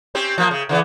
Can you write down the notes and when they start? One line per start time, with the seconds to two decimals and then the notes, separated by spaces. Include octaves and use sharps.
0.15 C4 C#4 G4
0.38 F3 A#3
0.51 C#3
0.69 C#3 E3 B3